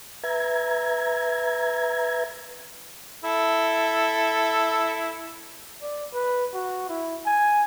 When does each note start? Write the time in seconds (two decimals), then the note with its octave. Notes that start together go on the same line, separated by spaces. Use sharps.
0.23 B4 E5 A#5 G#6
3.24 E4 A4
5.82 D5
6.13 B4
6.53 F#4
6.89 E4
7.25 G#5